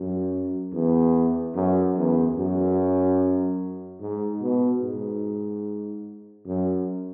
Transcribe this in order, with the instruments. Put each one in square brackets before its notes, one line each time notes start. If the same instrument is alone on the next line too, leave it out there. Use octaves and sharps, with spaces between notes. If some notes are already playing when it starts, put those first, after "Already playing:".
Already playing: [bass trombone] F#2
E2
F#2
E2
F#2
G#2
B2
G#2
F#2